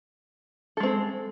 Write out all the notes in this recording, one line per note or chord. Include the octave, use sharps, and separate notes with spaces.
G#3 C4 A4